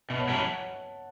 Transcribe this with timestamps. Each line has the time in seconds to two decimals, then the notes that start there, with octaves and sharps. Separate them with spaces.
0.10 B2 E5 A5
0.19 C#5 F#5
0.28 F#3 C#4 E4 E5 A5
0.37 C#5 F#5